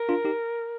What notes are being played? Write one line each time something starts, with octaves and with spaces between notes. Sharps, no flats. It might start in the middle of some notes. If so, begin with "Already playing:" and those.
Already playing: A#4
D4 F4
D#4 G4